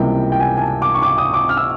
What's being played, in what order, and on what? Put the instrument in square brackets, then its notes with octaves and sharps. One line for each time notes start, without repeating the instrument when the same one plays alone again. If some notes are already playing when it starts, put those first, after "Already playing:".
Already playing: [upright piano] C#2 C3 E3 G3 A#3 G5
G5
G#5
G#5
A5
D6
C#6
D6
D#6
D6
F6
E6